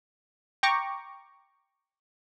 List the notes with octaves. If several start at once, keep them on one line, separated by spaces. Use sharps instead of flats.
G5 A#5 C#6 D6